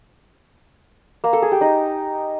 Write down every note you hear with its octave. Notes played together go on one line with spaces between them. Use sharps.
A#3
A4
G#4
G4
D#4